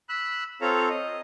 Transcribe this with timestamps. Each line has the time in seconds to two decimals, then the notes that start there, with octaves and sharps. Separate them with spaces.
0.09 B5 E6 F#6
0.61 C4 F4 A4 C#5 F5 A#5
0.89 D#5